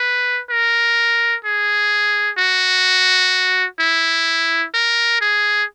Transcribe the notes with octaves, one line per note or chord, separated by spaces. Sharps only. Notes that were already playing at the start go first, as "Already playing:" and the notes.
Already playing: B4
A#4
G#4
F#4
E4
A#4
G#4